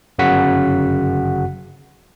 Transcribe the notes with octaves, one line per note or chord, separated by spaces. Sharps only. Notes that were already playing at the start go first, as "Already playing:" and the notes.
G1 F#2 C#3 F#4 F#5 B6